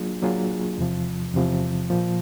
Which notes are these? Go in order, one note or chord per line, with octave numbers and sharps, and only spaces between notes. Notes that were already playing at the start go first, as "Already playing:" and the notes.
Already playing: F#3 A#3 D4 F4 G#4
F#3 A#3 D4 F4 G#4
E2 C3 F3
E2 C3 F3
A#2 F3 A#3